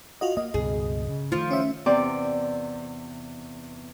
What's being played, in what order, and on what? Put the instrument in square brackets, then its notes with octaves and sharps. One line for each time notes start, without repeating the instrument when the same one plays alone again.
[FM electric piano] F4 F#4 D#5
[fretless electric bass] A#3 [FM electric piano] D#5
[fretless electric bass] C#2 G2 B2 [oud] G#4
[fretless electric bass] C#3
[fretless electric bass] D#3 A3 [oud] F3 F4
[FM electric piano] C#4 E5
[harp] E2 C3 C4 D5 D6